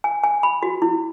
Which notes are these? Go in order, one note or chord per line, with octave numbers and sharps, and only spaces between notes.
G#5
G#5
B5
F#4
E4